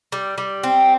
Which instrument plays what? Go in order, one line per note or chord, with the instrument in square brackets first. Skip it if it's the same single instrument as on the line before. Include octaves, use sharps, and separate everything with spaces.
[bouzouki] G3
G3
C4